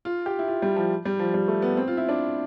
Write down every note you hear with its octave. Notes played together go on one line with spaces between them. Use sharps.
F4
G4
E4
F4
G3
F3
G3
F3
G3
A3
B3
C4
F4
E4
D4